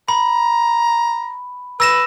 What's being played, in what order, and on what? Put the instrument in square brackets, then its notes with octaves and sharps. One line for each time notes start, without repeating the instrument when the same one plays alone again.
[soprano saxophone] A#5 [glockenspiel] B5
[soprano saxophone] B4 [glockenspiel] E6 A#6 E7